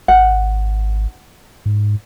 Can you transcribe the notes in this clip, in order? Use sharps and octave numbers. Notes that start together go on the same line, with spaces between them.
G#1 F#5
G#2